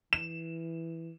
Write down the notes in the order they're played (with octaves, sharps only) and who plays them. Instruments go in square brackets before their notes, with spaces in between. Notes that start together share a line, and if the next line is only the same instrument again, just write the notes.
[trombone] E3 [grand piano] E7